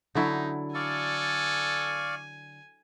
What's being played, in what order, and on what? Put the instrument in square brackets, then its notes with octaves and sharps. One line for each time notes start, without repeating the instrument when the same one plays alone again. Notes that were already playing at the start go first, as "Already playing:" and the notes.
[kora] D3 F#3 E4 [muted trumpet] D#4
[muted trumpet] A4 [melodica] D5 F5 C#6 [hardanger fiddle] G#5